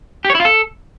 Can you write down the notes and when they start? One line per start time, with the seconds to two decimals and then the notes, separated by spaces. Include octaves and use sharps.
0.25 G4
0.30 C#5
0.35 E4
0.40 F4
0.45 A4